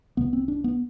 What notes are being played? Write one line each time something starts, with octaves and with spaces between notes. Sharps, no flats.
C2 C3 B3
C4
D4
B3